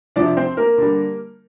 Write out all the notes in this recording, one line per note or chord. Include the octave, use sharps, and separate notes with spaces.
C3 F3 D4 D5
C4 C5
A#3 A#4
D3 G3